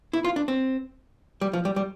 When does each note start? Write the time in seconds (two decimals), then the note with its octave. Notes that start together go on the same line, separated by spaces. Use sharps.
0.13 E4
0.25 F4
0.36 D4
0.48 C4
1.41 G3
1.53 F3
1.65 G3
1.76 G3